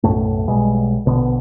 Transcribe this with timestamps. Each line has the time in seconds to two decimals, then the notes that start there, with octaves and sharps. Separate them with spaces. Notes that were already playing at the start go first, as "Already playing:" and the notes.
0.03 B1 F#2 A2 A3
0.47 B1 B2 G3 G#3
1.06 A#1 B2 D3 B3